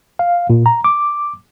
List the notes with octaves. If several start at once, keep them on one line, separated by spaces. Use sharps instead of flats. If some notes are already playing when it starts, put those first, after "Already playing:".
F5
A#2
A#5
D6